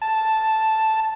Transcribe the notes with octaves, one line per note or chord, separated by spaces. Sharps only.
A5